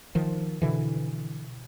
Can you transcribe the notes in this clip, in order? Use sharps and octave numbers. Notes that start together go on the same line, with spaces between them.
D#3 F3
B2 D3 E3